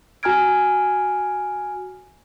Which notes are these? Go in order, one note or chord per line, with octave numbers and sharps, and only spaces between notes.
F#4 G#5 A#5 F6 G#6 D7